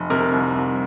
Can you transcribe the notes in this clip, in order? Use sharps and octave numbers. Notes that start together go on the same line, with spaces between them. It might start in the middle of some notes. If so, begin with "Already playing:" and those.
Already playing: F1
C3 A#4
C2
C2